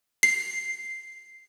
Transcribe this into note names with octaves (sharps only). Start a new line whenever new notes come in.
C7